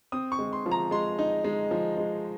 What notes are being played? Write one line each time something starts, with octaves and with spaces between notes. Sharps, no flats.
C4 D#6
C#6
G#3
C6
F3
A#5
G#3 C6
D#4
G#3
F3
G#3